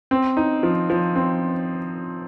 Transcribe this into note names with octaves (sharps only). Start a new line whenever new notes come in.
C4
D#4
F3
F3
C4